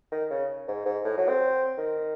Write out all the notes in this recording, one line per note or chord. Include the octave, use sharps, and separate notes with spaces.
D#3
C#3
G#2
G#2
A2
F#3
C4
D#3